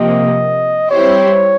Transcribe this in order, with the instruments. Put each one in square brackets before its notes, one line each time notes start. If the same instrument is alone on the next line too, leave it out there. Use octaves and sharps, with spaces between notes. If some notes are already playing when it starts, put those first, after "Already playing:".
Already playing: [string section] C3 F3 A#3 [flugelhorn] D#5
[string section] G3 C4 E4 G4 C5 [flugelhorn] C#5